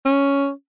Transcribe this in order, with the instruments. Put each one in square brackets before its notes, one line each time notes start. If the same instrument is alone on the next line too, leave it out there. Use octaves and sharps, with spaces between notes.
[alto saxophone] C#4